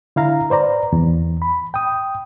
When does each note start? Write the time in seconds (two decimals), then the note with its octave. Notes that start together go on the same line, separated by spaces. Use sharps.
0.16 D3 E4 F5 A#5
0.50 B4 C5 D5 A#5
0.92 E2
1.42 B5
1.74 G5 D#6